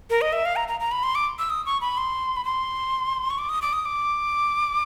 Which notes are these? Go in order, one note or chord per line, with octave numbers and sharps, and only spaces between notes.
A#4
D#5
E5
F5
A#5
A#5
A#5
B5
C6
D6
E6
D#6
C#6
B5
C6
B5
C6
C#6
D6
D#6
D6
D#6
D6